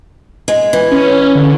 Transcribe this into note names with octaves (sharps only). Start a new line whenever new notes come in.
G#3
E3
C#4
D3